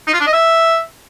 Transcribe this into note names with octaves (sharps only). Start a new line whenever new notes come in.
D#4
F4
D4
D#5
E5